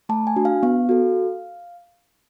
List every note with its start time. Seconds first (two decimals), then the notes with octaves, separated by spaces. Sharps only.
0.09 A3 A5
0.27 G#5
0.36 D4 F#4
0.45 F5
0.63 B3 F5
0.89 F#4 A4